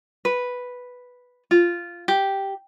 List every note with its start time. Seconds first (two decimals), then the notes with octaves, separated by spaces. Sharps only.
0.25 B4
1.51 F4
2.08 G4